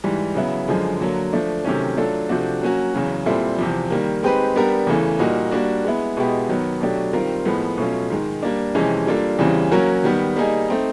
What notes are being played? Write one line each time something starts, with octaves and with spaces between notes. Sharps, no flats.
G#2 E3 G3
C#3 F#3 B3 E4
F#2 D3 F3 G#3
D3 F#3 A#3
F3 A3 D4
C3 D#3 F#3 A3 C#4
F#3 A3 D4 F4 A4
C3 F3 A3 D4 F#4
F#3 A#3 C#4 F#4
E2 C#3 F#3
A#2 G3 C4 E4 A4
E2 C3 F3
D#3 G3 A#3
G#3 C4 D#4 G4 B4
G3 B3 D4 G4 A#4
E2 C#3 E3 A3
A#2 G3 A#3 D#4 F#4
G3 A#3 D4 F#4
G#3 B3 E4
B2 G#3 B3 E4 G4
D#3 F#3 B3
B2 F#3 A3 D4 G4
D#3 G3 C4 F4 A#4
A2 F3 G#3 B3
B2 F#3 A3 C#4 F4
G#2 D#3 G#3
G3 A#3 D4
F2 C3 E3 G#3 C#4
G3 A#3 D4 F4 A4
E2 C#3 E3 G3 C4
F#3 A#3 C#4 F#4 A#4
D#3 G3 B3
G3 A#3 D#4 G#4
A3 C4 D#4